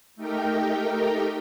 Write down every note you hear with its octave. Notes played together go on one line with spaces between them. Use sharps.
A3 D#4 G4 A#4 G5